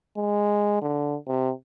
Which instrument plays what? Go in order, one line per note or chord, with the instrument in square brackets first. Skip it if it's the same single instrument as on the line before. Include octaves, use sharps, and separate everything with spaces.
[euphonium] G#3
D3
C3